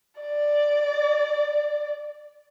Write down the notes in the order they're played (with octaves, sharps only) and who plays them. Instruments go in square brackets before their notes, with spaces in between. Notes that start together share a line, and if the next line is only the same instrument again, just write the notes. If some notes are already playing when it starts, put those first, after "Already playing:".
[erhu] D5